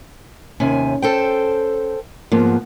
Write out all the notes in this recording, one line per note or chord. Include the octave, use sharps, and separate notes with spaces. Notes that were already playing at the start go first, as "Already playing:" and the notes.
D#2 C3 C#4 G#5
A4 C5 G5
G#2 F3 A#3 B3